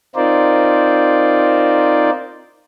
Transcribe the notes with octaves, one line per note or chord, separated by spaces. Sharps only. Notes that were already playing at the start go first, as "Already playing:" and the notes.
C4 D#4 F4 A#4 C5 D5